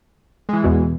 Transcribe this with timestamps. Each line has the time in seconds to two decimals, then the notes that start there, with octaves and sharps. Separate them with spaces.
0.49 E3 G#3
0.64 E2 B2